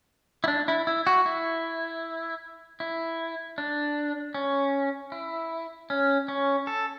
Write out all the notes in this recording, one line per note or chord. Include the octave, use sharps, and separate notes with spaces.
E4
D4
E4
E4
F#4
E4
E4
D4
C#4
E4
C#4
C#4
A4